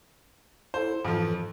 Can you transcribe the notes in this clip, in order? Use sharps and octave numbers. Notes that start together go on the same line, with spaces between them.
E4 A4 C5
F2 G#2 E3 F3 A4